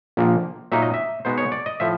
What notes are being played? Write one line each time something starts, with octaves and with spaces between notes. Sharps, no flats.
A#1 A#2 F3 A#3
A#2 F#3 A#3 D#4 E5
D#5
E5
B2 G#3 B3 D#4 C5
C#5
D5
D#5
A2 F3 E5